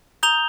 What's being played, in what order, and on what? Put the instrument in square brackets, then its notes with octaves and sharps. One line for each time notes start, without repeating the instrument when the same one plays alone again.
[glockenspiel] A#5 D#6 G6 F7 G7